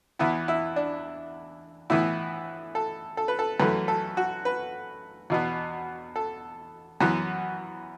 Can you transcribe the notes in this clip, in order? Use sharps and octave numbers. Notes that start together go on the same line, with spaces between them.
E2 E3 B3 E4
E4
D4
A2 E3 B3 E4
A4
A4
B4
A4
F#2 E3 A3 B4
A4
F#4
B4
E2 B2 B3
A4
F#2 E3 B3 F#4